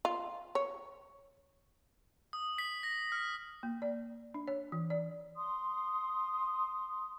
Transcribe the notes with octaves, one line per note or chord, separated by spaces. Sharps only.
F4
C#5
D#6
B6
A#6
F6
A#3
D5
D4
C#5
E3
D5
C6 D#6